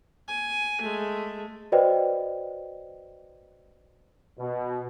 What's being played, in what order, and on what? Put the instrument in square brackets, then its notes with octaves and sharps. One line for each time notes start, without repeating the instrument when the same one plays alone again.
[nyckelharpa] G#5
G#3 A3
[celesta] F#4 B4 C5 D5 D#5 G5
[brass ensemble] B2